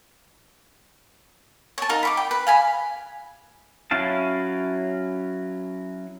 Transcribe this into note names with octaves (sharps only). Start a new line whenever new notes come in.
C#5 A5
D#4 A#4 F5
B5 C#6 D6
G5
B4
F5 G#5 B5
F#3 C#4 E4 F5 A5